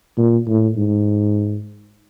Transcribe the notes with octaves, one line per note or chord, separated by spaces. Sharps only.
A#2
A2
G#2